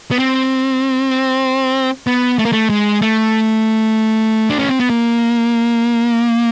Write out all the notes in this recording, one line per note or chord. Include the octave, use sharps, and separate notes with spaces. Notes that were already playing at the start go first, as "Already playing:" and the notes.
B3
C4
B3
A3
A#3
A3
G#3
A3
D4
C#4
C4
B3
A#3